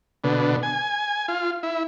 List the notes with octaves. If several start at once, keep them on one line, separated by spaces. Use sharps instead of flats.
B2 D3
G#5
F4
E4